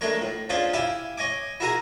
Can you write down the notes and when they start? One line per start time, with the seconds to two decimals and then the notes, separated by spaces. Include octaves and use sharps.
0.01 G#3 A3 D4 A#4 C#5
0.22 A2
0.49 C#4 D4 F4 G#4 C5 D5
0.73 E4 G4 E5 F5 G#5
1.18 C#5 D#5 G#5 D6
1.60 E4 F#4 G#4 A#4 G#5 A#5